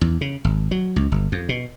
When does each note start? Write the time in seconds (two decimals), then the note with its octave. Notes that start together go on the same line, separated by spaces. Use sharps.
0.01 E2
0.21 C#3
0.45 G#1
0.71 F#3
0.96 C#2
1.12 G1
1.32 F2
1.49 B2